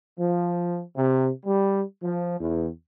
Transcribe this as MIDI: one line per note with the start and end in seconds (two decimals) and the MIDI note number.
0.19 0.81 53
0.96 1.30 48
1.46 1.82 55
2.02 2.35 53
2.40 2.67 40